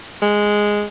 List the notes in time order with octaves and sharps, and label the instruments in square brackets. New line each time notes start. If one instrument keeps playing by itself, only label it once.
[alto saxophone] G#3